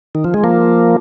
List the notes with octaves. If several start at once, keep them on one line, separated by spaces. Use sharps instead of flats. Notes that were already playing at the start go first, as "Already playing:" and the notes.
D#3
F3
G#3
F3 A#3